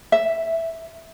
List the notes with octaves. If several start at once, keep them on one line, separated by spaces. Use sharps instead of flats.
E5